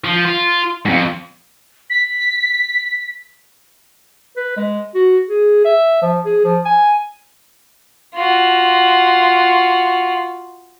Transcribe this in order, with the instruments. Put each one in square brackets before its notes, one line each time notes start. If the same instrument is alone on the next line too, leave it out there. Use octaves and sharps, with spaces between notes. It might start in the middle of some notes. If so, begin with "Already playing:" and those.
[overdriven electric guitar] F3
F4
F2 G#2
[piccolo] B6
[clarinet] B4
G#3
F#4
G#4
E5
F3
G#4
F3
G#5
[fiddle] F4 F#4